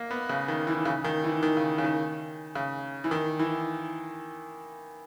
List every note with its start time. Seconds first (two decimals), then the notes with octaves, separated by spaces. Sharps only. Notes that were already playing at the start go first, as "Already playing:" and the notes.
Already playing: A#3
0.11 B3
0.29 C#3
0.48 D#3
0.67 E3
0.85 C#3
1.04 D#3
1.24 E3
1.43 D#3
1.57 C#3
1.78 C#3
1.84 D#3
2.55 C#3
3.04 E3
3.11 D#3
3.39 E3